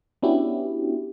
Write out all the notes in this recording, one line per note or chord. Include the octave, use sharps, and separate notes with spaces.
B3 C#4 D4 E4 F#4 G4